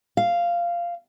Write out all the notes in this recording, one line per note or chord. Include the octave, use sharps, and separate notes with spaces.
F5